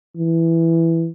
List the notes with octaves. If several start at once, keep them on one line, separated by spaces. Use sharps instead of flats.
E3